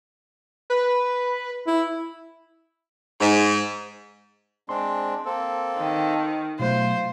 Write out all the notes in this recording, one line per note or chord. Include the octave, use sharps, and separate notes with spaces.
B4
E4
G#2
G#3 C4 D4 C6
A#3 C4 A4
D#3
B2 F#3 A3 F4 C5